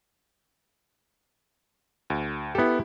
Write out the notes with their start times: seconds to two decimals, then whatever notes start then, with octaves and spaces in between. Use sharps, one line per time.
2.10 D2
2.55 B3 E4 G4 A4